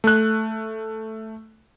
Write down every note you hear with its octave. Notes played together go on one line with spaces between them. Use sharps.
A3 F#6